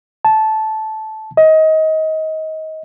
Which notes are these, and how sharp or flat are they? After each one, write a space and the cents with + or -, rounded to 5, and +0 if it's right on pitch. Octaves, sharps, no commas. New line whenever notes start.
A5 -10
D#5 +25